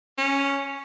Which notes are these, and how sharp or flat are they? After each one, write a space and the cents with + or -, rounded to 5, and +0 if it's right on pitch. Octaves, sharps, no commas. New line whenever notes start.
C#4 +0